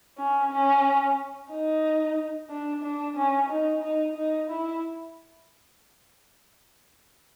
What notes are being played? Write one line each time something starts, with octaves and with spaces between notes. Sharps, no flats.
C#4
C#4
D#4
D4
D4
C#4
D#4
D#4
D#4
E4